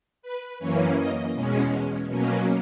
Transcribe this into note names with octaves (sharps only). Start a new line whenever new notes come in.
B4
F#2 E3 A#3 C#4 C#5
D#5
E2 B2 G#3 C#4
B2 F#3 A#3 C#4